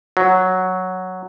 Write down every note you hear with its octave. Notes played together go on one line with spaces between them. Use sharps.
F#3